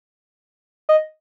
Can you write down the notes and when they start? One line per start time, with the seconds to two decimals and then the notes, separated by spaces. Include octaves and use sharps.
0.89 D#5